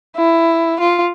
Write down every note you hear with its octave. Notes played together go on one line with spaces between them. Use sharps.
E4
F4